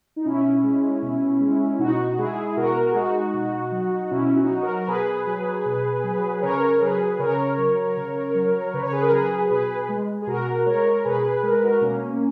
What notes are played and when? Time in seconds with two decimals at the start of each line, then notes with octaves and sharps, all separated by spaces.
0.16 D#4
0.25 B2 C#4 E4
0.63 G#3
1.02 B2
1.40 G#3
1.79 B2 D#4 F#4
2.18 G#3 E4 G#4
2.56 B2 F#4 A#4
2.91 G#4
2.95 G#3 D#4 F#4
3.34 B2
3.72 F#3
4.11 B2 C#4 E4
4.36 D#4 F#4
4.50 F#3
4.62 F#4 A#4
4.76 A#4
4.87 B2 G#4 B4
5.26 F#3
5.66 B2
6.04 F#3
6.42 C#3 A#4 C#5
6.81 F#3 G#4 B4
7.19 C#3 A#4 C#5
7.58 F#3
7.97 C#3
8.35 F#3
8.74 C#3 B4
8.83 C#5
8.92 G#4 B4
9.02 A#4
9.11 F#3 G#4 B4
9.50 B2 G#4 B4
9.89 G#3
10.22 G#4
10.27 B2 F#4 A#4
10.66 G#3 A#4 C#5
11.04 B2 G#4 B4
11.43 G#3 A#4
11.53 B4
11.63 F#4 A#4
11.81 B2 A#3 C#4